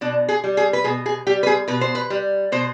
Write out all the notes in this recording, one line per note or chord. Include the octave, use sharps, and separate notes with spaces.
B2 D4
G#4
G3
G#4
B4
B2 G#4
G#4
G3 G4
B4
G#4
B2 B4
C5
B4
G3
B2 C5